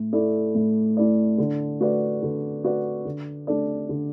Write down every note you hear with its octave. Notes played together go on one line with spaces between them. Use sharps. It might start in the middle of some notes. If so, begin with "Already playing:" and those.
Already playing: A2
A3 E4 A4 D5
A2
A3 E4 A4 D5
D3
A3 F#4 B4 D5
D3
A3 F#4 B4 D5
D3
A3 D4 A4 D5
D3